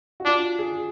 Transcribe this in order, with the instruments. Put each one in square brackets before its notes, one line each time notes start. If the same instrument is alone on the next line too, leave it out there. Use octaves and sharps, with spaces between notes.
[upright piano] F#4
[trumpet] D4 [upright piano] F4
[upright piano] G#4